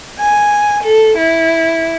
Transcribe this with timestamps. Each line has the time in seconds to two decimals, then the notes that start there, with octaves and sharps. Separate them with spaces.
0.19 G#5
0.83 A4
1.16 E4